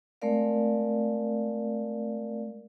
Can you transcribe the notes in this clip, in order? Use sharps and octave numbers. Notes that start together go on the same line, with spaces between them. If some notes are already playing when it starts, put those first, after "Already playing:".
G#3 A3 C4 A#4 D5 F5